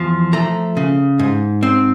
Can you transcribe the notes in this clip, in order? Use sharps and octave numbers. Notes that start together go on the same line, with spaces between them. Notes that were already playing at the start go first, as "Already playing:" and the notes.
Already playing: E2 F3
A3 A#5
C#3
G#2
C4